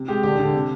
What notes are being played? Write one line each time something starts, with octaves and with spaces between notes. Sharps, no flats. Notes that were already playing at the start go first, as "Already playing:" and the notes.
Already playing: C3
G#3 G4
D3 G4
D3
C3